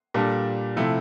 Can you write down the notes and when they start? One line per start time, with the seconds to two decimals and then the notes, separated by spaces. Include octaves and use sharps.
0.14 A#2 G3 D4 A4
0.76 C3 F3 A3 E4